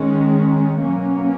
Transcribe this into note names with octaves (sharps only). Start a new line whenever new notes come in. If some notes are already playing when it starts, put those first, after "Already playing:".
Already playing: D#3 G#3 C#4
B2 F#3 A#3 C#4